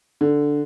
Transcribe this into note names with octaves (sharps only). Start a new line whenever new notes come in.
D3